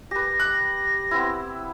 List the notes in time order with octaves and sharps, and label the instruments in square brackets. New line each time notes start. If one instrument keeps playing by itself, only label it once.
[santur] G4 B4 [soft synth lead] A#6
[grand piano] F#6
[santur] B3 C4 E4